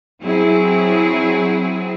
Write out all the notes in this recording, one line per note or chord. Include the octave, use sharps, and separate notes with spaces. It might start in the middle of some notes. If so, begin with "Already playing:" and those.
F#3 C4 E4 G#4